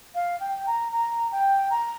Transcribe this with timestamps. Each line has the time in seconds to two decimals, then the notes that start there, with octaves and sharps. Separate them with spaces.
0.15 F5
0.40 G5
0.67 A#5
0.92 A#5
1.32 G5
1.70 A#5